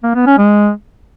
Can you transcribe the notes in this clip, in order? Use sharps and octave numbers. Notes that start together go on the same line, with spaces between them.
A#3
B3
C#4
G#3